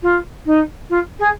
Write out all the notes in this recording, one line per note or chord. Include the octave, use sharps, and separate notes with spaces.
F4
D#4
F4
G#4